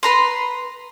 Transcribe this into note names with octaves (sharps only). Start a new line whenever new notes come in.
B4 A#5 C6